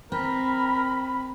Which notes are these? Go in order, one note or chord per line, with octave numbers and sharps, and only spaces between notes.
C4 A#4 B5